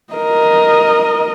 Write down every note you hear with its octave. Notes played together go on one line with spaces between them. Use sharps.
A#4 D#5